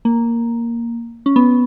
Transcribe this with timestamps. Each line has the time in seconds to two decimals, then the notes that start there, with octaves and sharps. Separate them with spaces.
0.05 A#3
1.26 C#4
1.36 B3